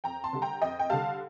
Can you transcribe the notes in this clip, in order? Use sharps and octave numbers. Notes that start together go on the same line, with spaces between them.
F2 G5 A#5
A5 C6
D3 G3
G5 A#5
F2 D#5 G5
G5
D3 G3 F5 A5